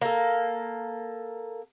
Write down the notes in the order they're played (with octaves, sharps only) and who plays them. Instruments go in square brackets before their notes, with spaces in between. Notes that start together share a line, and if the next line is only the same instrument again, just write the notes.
[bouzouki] A#3 A4